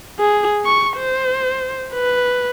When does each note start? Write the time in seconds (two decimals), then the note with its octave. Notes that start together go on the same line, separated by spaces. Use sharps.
0.20 G#4
0.65 C#6
0.97 C5
1.94 B4